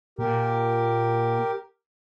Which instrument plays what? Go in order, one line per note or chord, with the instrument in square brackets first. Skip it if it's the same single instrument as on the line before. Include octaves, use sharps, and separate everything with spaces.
[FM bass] A#2 [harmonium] G4 A#4